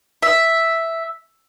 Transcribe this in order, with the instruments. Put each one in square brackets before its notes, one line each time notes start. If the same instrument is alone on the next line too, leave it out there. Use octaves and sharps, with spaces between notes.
[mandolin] E5